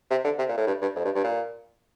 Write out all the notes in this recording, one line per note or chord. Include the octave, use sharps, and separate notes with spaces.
C3
D3
C3
A#2
A2
G2
G2
F2
G2
G2
A#2